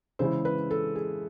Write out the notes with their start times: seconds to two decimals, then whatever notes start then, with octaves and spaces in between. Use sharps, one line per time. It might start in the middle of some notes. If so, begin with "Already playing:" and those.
0.19 C#3 E3 G#3 C#4 E4 C5
0.45 B4
0.71 A4
0.95 G#4